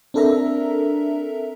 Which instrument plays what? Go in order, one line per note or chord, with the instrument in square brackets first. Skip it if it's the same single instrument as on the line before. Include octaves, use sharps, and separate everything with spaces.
[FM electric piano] C4 D4 A4 A#4 E5 A#5